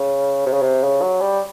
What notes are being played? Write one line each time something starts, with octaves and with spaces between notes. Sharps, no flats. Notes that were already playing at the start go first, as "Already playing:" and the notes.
Already playing: C#3
C3
C#3
C3
C#3
F#3
G3